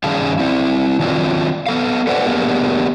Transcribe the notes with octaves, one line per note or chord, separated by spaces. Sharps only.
G2 D#3 C#4 G#4 F5 A5
C4 E4
D#3 F#3 C4 D4 F4
B3 A4 F5
A4 B4 C5 D5 F#5
A#3 B3 D4 G4 G#4 A#4